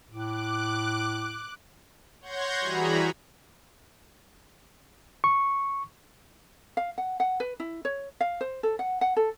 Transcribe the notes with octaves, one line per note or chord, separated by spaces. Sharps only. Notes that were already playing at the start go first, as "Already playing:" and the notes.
A2 D6 F#6
C#5 F#5 C6 G6 G#6 A#6
E3 G3 F#4 G#4 A#5 B5
C#6
F5
F#5
F#5
B4
E4
C#5
F5
C5
A4
F#5
F#5
A4